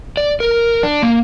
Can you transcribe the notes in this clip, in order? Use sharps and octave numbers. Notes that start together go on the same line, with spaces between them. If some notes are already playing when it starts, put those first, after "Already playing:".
D5
A#4
D4
A#3